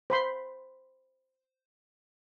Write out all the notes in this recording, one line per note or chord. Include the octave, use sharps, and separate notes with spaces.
C5 B5 C6